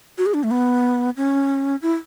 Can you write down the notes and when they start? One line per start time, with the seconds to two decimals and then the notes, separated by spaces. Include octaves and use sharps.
0.18 F#4
0.26 G#4
0.34 D4
0.43 A3
0.51 B3
1.17 C#4
1.82 E4